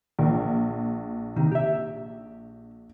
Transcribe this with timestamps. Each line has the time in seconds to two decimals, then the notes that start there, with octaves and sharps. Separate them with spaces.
0.19 A#1
1.36 C3 D#3
1.52 G4 E5